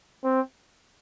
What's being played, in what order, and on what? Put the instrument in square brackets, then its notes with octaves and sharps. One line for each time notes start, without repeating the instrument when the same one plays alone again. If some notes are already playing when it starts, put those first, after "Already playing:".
[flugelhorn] C4